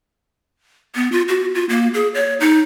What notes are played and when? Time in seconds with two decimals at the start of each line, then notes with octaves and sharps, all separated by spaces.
0.95 B3
1.12 F4
1.28 F#4
1.55 F4
1.69 A#3
1.94 G#4
2.14 C#5
2.40 D#4